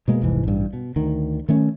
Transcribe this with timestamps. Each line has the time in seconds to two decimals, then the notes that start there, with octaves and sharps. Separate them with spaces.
0.08 B2 G#3 A#3
0.21 F1 C2 G#2 E3
0.44 A1 G2
0.73 B2
0.96 D2 D#3
1.48 D#3 A3 C#4